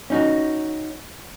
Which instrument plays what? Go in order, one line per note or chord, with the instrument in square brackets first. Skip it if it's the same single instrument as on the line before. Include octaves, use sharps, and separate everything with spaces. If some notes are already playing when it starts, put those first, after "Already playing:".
[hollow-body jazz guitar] C#4 D#4 F#4